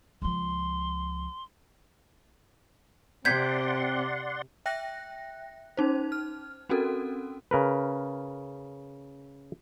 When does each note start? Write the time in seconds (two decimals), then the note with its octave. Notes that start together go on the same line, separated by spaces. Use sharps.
0.22 C#2 F3 C6
3.25 C3 C4 D5 F#5 C6 G6 G#6 B6
4.66 E5 G5 F#6 A#6
5.77 C#4 D#4 C5
6.12 F6
6.69 C4 C#4 F#4 A4 A#4
7.51 C#3 A#4 B4